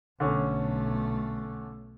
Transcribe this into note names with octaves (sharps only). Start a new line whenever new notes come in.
B1 D3 A3 C#4